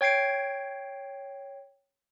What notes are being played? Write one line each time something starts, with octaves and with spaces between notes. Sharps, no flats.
C#5 G5 G#6 C7 D7